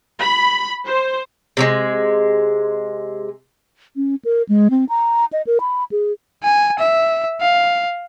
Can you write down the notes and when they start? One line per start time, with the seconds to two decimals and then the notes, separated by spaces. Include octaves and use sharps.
0.21 B5
0.85 C5
1.57 C3 G3 G#3
3.96 C#4
4.25 A#4
4.49 G#3
4.70 C4
4.89 A#5
5.33 D#5
5.47 A#4
5.60 B5
5.92 G#4
6.44 G#5
6.79 E5
7.41 F5